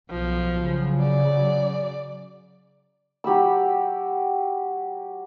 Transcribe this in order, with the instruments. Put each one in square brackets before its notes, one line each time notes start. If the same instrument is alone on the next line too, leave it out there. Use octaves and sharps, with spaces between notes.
[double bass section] B1 [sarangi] F3
[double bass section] C#3 F#3
[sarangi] D5
[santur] F#3 G4 B5 E6